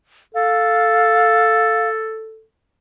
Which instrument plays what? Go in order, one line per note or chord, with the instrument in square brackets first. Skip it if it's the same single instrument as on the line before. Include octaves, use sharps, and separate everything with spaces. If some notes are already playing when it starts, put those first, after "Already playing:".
[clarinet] A4 [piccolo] F5